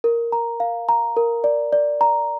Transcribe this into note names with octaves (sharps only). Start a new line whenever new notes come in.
A#4
A#5
F5
A#5
A#4
D5
D5
A#5